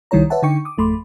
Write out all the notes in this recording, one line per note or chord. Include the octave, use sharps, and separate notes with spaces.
C2 D#3 G3 E4 C#5 A#5
B4 C#5 E5 F#5 A5
D3 D#4 G5 C#6 C#7
D6 D#6
G#1 F2 A3 B5 C6 D6